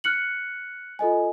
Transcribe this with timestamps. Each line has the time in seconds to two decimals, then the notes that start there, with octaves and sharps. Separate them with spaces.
0.04 F6 F#6 C#7 F#7
0.99 F4 A4 D#5 G#5